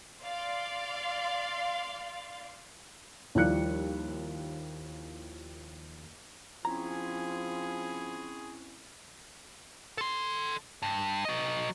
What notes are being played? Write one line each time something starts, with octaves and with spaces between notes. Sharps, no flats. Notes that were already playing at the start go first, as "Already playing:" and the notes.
D5 F5 C6
D#2 F3 G3 E4 F#6 C#7
F3 C4 C#4 E4 G#4 A#5
A4 C6
G2
F#3 D#5